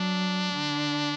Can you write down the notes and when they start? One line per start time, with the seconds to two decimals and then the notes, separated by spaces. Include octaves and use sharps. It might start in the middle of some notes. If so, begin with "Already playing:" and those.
Already playing: F#3 D4
0.53 D3